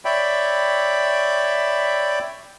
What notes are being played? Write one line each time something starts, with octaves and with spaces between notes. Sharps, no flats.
C#5 D5 E5 G5 B5